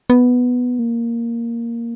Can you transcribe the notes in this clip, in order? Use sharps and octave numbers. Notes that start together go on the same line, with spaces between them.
B3
A#3